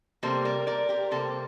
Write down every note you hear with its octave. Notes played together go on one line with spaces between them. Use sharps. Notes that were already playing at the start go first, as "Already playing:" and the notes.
C3 G3 A#3 A4 C5
A#4 D5
A#4 D5
G4 A#4
C3 G3 A#3 A4 C5